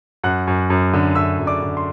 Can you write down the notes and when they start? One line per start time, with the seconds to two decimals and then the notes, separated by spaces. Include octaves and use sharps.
0.24 F#2 F#5 F#6
0.47 F#2
0.70 F#2
0.94 D3
1.15 F#2 E5 E6
1.39 F#2
1.47 D5 D6
1.62 D3
1.77 C6